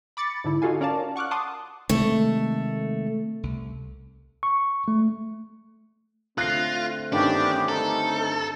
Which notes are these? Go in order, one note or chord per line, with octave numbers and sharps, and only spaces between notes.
B5 D6 A6 C#7
G#2 D3 E4
D#4 F4 F#4 A4 F5 G#5
C#4 A#4 D5 F5 A5
F#5 C#6 D6 F6 F#6
F#5 A5 C6 D6 D#6
C3 D#3 G#3 A3
C2
C#6
A3
D3 A3 C4 F4 F#6 A#6 C7
G2 D#3 B3 C#4 D4 G4
D#4 A4